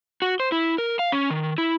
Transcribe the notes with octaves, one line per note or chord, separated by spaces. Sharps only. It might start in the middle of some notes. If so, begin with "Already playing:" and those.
F#4
C5
E4
A#4
F5
C#4
D#3
E4